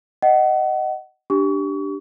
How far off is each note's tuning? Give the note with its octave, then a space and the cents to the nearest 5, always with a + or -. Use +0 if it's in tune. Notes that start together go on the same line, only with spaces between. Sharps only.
D#5 +0 F#5 +30
D4 +0 G4 -5 C#6 +30